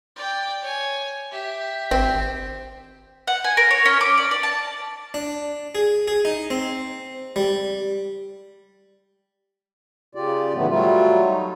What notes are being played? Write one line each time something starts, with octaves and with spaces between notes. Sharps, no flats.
D5 G5
C#5 G#5
G4 E5
G#1 C4
F#5
G#5
A#4
C#5
C#4
D6
D5
D5
A5
D4
G#4
G#4
D#4
C4
G3
C#3 F4 G4 D5
A2 D#3 E3 F#3 A3 B3
F#3 G3 A3 F4
D#4